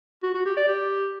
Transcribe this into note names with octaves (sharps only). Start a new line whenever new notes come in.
F#4
F#4
G4
D5
G4